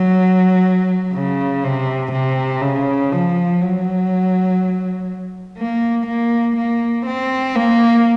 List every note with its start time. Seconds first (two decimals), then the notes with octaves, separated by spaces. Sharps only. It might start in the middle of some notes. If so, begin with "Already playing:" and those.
Already playing: F#3
1.14 C#3
1.64 C3
2.12 C3
2.62 C#3
3.12 F3
3.61 F#3
5.59 A#3
6.07 A#3
6.57 A#3
7.07 C4
7.56 A#3